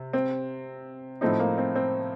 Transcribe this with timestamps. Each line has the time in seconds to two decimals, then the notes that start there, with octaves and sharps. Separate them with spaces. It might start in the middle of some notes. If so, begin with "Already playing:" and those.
Already playing: C3
0.13 C4
1.21 A2 F3 A3 C4 D#4
1.40 A#3
1.58 C4
1.75 C4